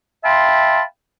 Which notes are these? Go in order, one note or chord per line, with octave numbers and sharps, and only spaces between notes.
E5 F5 G5 A5 B5 C6